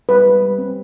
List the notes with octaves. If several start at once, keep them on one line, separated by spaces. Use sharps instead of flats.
G3 B4
G3
G3
C4